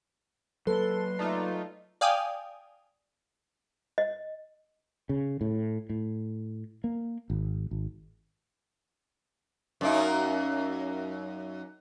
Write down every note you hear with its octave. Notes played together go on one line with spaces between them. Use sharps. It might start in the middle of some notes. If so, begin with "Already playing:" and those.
F#3 A#3 A4 B4 C6
A3 D#4 F4 D5
D5 F5 G5 G#5 D#6
D#5
C#3
A2
A2
A#3
G#1
G#1
F#2 A#3 D#4